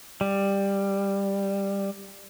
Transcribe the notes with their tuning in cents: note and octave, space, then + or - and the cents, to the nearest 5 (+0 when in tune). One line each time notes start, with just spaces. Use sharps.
G3 +10